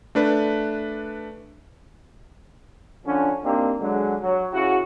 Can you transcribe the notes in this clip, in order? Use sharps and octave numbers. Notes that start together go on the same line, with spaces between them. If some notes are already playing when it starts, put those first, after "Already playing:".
A3 D4 B4
D3 F3 C#4 D4
A#3 C4 D4 D#4 G4
D3 F#3 G#3
F#3
C#3 E4 F#4